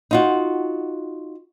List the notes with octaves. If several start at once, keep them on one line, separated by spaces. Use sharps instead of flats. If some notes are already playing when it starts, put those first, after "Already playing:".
D#4 F4 F#4